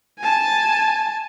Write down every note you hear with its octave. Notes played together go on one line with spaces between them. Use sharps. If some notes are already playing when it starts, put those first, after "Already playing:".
G#5 A5